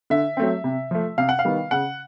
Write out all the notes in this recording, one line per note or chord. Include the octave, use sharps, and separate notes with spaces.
D3 E5
F#3 A3 C4
C3
F3 A3
C3 F5
F#5
F5
D#3 G3 B3
C#3 F#5